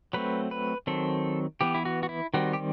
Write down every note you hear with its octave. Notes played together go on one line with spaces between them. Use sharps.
F#3 A3 C4 B4
B4
D#3 F#3 C4 A4
E3 B3 G4
E4
F#4
F#4
E4
D#3 G3 C4 F#4
G4